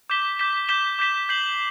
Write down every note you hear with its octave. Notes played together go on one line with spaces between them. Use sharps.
D6 G6 B6 E7 G7
D6 G6 B6 E7 G7
D6 G6 B6 E7 G7
D6 G6 B6 E7 G7
G6 C7 F#7